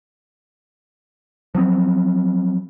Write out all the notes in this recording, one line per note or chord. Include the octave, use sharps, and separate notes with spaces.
F3 F#3 C4